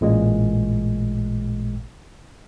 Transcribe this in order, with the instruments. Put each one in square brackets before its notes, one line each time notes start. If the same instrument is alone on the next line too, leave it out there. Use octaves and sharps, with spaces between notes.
[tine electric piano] A1 A#2 G#3